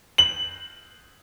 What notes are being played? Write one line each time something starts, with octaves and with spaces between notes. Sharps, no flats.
F#7